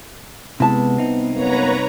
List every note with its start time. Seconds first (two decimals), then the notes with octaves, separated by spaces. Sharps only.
0.60 C3 G#3 B3 E4 A5
0.97 C2 C4 D#4
1.33 F#2 A#3 B3 B4 C#5 A#5